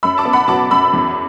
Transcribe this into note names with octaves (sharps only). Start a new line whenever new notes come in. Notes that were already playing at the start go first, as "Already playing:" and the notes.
F#2 B5 E6
A5 D6
B3
F#5 B5
F#3 A5 D6
F#2 B5 E6
E2